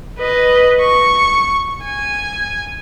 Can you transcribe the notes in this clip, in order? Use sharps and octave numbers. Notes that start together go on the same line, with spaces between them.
B4 D#5
C#6
G#5